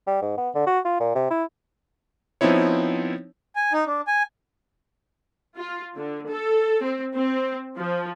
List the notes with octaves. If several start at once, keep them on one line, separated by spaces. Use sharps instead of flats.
G3
G#2
B3
D3
F#4
F4
A#2
C3
E4
F3 B3 C4 D#4 E4 C#5
G#5
D#4
D4
G#5
F4
D3
A4
C4
C4
F3